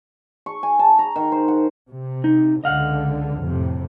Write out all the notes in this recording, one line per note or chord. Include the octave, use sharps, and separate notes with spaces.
C#6
G#5
A5
A#5
D#3
C5
F#5
C3
D#4
C#2 D3 D#5 F5 F#5
F2 A2 C3